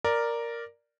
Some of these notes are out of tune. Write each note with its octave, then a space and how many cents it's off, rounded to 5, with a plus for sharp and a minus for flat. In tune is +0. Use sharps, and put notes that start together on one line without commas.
A#4 +0 D5 +0